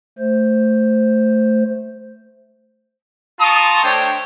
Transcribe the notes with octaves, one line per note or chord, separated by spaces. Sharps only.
A3 C5
F4 A5 A#5 C6 C#6 D#6
A3 D4 C5 C#5 G5